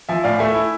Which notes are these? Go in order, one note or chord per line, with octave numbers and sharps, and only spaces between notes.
F3 E5 G#5
A2 D5 F5
A3 E5 G#5
E4